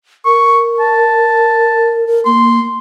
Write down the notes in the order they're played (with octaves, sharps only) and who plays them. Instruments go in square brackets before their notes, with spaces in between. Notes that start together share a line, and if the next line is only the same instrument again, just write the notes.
[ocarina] A#4 [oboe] C#6
[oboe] A5
[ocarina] A#4
[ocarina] A#3 [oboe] C6